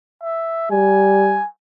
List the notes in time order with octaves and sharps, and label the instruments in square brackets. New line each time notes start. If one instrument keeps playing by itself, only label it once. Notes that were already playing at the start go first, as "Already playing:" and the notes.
[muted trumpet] E5
[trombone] G3 [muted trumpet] G#5